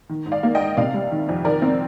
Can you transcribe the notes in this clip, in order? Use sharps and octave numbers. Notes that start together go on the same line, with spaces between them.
D#3
G#2
D5 F5
A#3
D#5 G5
G#2
C3 D5 F5
G3
D#3
F2
D#3 A#4 D5
C4